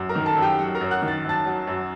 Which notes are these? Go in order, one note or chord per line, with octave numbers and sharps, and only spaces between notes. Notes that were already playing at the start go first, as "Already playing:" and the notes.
Already playing: F#2
A#4 A#5
D#3
A4 A5
F#2
G4 G5
F#3 F#4 F#5
A#4 A#5
F#2
F#5 F#6
D#3
A6
F#2 A5 A6
F#3
F#2